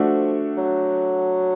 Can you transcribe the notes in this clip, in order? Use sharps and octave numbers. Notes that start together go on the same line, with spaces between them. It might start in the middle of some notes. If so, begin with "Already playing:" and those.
Already playing: F3 A3 D4 F#4 A4
F#3